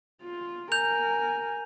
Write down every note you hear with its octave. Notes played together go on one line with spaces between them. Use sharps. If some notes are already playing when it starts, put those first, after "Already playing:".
F4
A#4 G#5 G6 F7